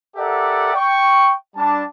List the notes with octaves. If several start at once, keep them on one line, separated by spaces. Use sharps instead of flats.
G4 A4 A#4 D5 E5 F#5
G5 C#6
G3 D4 A5